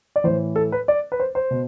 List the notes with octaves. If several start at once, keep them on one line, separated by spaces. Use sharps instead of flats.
D5
A2 E3 C5
A4
B4
D5
B4
C5
C5
B2